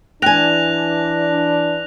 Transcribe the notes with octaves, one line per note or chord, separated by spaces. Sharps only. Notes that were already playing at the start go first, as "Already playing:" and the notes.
E3 D4 G5 G#5 F#6 A#6 F7